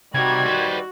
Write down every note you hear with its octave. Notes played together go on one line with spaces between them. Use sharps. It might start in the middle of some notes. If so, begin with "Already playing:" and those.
C3 D#3 G3 F#4 G#6
B4 C5